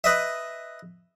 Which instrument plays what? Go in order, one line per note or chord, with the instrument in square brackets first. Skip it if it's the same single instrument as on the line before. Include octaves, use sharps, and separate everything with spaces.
[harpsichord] B4 D#5 E5